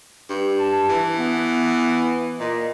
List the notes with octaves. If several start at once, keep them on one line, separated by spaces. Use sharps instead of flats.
G2
A5
E3
B3
A#2 D#5